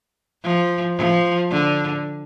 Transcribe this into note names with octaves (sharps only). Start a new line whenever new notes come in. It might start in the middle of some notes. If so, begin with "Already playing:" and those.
F3
F3
D3